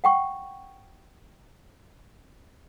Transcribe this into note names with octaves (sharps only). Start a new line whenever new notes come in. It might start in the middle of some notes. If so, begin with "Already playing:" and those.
F#5 G5 C#6